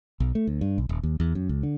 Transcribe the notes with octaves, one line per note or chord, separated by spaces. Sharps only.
B1
A3
D2
G2
B1
D#1
D#2
E2
F#2
C#2
D3